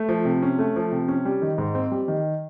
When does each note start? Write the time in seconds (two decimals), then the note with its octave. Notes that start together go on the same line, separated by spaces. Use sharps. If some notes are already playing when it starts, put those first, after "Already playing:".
Already playing: A3
0.09 F3
0.25 C3
0.42 C#4
0.59 A3
0.76 F3
0.92 C3
1.08 C#4
1.25 G3
1.42 D#3
1.58 G#2
1.75 C4
1.92 G3
2.08 D#3